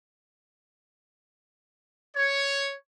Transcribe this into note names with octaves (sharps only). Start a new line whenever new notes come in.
C#5